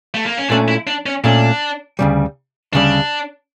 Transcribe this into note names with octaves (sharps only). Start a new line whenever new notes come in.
A3
A#3
C#4
A#2 A3 C#4 D4
E4
D4
C#4
A#2 A3 C#4 D4
D2 C#3 G3
D2 C#3 G3 D4